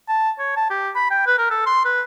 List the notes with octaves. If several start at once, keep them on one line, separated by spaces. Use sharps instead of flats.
A5
C#5
A5
G4
B5
G5
B4
A#4
A4
C6
B4